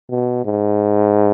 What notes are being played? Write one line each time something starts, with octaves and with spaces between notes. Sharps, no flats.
B2
G#2